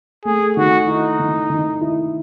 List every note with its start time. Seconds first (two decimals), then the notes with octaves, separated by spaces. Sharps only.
0.25 A3 G#4
0.57 D#3 F#4
0.87 D#4 E4
1.20 D#3
1.50 D#3
1.81 E4